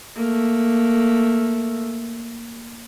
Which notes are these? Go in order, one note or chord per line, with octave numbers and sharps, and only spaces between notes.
A3 A#3